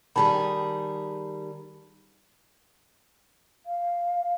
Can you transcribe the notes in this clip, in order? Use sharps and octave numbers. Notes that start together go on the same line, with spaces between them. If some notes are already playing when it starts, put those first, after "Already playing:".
D#3 G3 G#4 A5 B5
F5